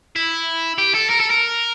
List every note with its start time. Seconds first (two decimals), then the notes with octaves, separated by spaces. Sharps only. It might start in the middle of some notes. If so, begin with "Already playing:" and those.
0.16 E4
0.78 G4
0.94 A4
1.09 A#4
1.20 A4
1.30 A#4